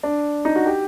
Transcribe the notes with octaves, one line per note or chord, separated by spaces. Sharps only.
D4
D#4
F#4
G4